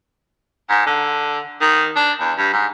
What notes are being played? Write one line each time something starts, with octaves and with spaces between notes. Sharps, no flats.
G#2
D3
D#3
D4
E2
G2
G#2